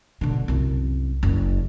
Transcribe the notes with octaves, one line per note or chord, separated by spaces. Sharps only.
B2 D3
C2 F#2
F#1